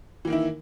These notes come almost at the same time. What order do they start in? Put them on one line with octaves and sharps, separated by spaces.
E3 A#3 D#3 E4